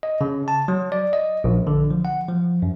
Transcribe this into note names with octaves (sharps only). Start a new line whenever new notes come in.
D#5
C#3
A5
F#3
D5
D#5
A#1
D3
F3
F#5
F3
F#2